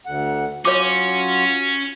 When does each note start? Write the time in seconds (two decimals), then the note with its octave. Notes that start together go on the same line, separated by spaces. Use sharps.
0.06 D2 F#5
0.65 F#3 C#4 F4 F#4 C#5 D6